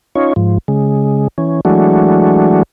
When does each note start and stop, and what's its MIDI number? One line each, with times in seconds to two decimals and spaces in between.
0.15 0.33 61
0.15 0.33 63
0.15 0.33 65
0.15 0.33 73
0.36 0.58 44
0.36 0.58 53
0.68 1.28 49
0.68 1.28 56
1.38 1.61 52
1.38 1.61 61
1.65 2.63 52
1.65 2.63 54
1.65 2.63 56
1.65 2.63 57
1.65 2.63 62
1.65 2.63 66